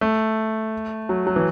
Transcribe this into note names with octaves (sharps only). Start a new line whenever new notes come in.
A3
F#3
F#3
E3